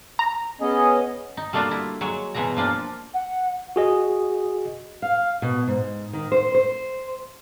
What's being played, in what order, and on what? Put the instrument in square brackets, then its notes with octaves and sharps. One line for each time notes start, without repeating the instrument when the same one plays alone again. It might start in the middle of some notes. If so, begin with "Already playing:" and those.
[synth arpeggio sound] A#5
[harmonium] B3 C#4 D#5 [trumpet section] G#4
[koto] D#4
G3 A3 A#3 D4 F4 F#4
E4
F#3 G#3 C#5
B2 E3 F#3 G#3 A#5
F3 A#3 D4 F4
[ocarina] F#5
[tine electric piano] F#4 G#4 D#5
[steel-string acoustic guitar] F5
B2
G#2
D#3
C5
C5